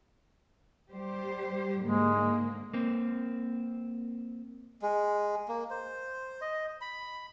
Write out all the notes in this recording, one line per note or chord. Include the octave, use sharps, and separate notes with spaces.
G3 G4 C5
G#2 D3 G#3 A#3
A#3 C4
G#3
A#3
C5
D#5
B5